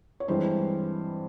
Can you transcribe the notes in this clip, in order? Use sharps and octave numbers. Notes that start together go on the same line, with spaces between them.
C#5
G2 E3 G#3 C4 C5